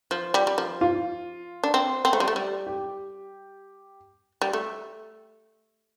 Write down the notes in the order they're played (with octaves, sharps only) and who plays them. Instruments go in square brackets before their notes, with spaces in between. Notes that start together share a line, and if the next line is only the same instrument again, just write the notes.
[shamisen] F3
G3
G3
F3
[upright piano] F4
[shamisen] D4
C4
C4
A3
G3
A3
G3
[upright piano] G4
[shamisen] G3
A3